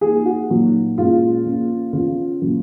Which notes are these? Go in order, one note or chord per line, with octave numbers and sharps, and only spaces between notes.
F3 A#3 D#4 G#4
F#4
A#2 F#3 A#3 D#4
A#2 G#3 C#4 F4
F3 A#3 C#4
C#3 F3 B3 F4
A#2 F#3 C#4